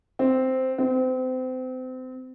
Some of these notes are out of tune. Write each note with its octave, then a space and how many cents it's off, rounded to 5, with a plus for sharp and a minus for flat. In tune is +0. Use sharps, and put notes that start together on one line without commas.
C4 -5
C4 -30